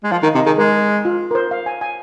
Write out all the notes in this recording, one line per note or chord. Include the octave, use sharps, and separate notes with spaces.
G#3
F3 F5
D#3 D#4
C3 D#4
D#3 G#4
G#3 A#4
F4
A#4
C5
F5
G#5
G#5